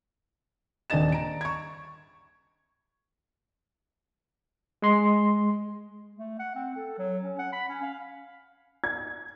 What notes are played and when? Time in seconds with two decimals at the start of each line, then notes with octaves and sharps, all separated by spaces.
0.90 D#1 D#3 D4 D#5 A6 E7
1.12 A#5 D7
1.41 C#6 G#6
4.82 G#3 C6
6.16 A3
6.39 F#5
6.55 C4
6.76 A4
6.98 F#3
7.23 C#4
7.39 F#5
7.52 B5
7.68 C#4
7.82 F5
8.84 G#6